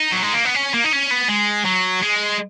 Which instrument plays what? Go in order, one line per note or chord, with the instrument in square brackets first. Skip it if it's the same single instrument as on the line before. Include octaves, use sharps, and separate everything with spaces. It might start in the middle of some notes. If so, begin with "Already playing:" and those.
Already playing: [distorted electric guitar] D#4
F#3
G#3
A#3
B3
C#4
A#3
D#4
C#4
B3
G#3
F#3
G#3